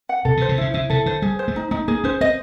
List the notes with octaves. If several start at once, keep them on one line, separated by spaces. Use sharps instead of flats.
F#5
C3 A4
C3
C5
C3
C#3 E4
C#3 E4
C3 A4
D3 C5
G3 G#4
C5
A3
D#4
A3 D#4
A#3 G#4
C#4 C5
C4 D#5